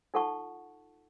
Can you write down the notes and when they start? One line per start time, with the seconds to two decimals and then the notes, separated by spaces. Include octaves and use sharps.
0.14 D#4 F4 A4 F#5 A5 C#6